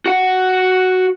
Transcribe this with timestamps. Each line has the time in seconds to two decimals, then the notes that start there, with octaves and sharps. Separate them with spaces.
0.06 F#4 F#5